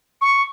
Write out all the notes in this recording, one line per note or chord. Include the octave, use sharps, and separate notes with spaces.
C#6